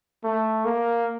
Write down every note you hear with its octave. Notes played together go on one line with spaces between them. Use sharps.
A3
A#3